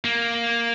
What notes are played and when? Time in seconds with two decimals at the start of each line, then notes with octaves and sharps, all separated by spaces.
0.05 A#3